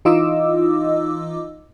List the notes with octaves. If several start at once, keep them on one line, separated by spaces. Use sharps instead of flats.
E3 D#4 F4 D#5 D6 E6